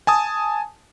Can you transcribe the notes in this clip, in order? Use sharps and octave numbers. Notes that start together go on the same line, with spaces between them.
G#5 A5 D#6